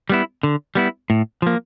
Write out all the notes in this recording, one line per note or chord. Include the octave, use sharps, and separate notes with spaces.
G3 B3 E4
D3
G3 B3 E4
A2
F3 A#3